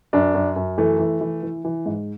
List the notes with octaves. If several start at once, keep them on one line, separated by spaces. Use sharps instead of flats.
F#2 D4
F#2
F#2
E3 A3
E3
E3
E3
E3
G#2